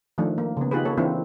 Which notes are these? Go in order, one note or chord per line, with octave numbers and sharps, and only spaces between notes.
D#3 F3 A3 D4
A#3
C#3 B3
D#4 F4 G4 G#4 B4
A#3 A4 C#5
E3 A#3 C4 D4 E4 F4